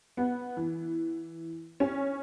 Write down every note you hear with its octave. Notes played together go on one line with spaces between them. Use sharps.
B3
E3
C#4